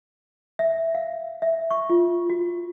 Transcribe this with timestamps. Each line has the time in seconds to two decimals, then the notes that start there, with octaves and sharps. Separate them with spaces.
0.59 E5
0.95 F5
1.42 E5
1.71 C#6
1.90 F4
2.30 F#4